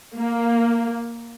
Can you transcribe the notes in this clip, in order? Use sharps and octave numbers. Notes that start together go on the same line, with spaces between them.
A#3